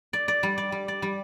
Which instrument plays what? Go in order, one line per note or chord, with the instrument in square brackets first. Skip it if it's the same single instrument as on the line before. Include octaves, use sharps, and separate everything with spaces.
[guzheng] D5
D5
G3
D5
G3
D5
G3